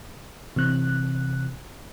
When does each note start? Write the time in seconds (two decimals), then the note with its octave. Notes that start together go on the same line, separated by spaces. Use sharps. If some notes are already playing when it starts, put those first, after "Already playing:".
0.56 C3 E3 C4 F#6